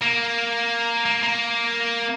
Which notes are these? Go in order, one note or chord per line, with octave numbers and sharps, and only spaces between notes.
A#3
A#3
A#3